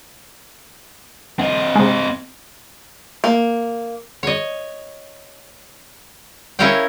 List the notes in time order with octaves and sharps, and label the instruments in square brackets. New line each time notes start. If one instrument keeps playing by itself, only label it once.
[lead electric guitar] C4 D#5
[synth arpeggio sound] C3 G#3
[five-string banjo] A#3
[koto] C#5 D#5
C#4 E4 A#4 C#5 F5 G5